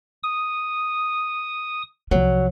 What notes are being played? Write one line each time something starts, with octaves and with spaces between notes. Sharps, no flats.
D#6
C2 F3 F#3